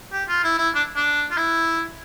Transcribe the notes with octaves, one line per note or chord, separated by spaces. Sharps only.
G4
F4
E4
E4
D4
D4
F4
E4